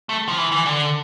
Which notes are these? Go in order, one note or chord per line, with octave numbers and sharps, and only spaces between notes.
A3
F3
E3
E3
D3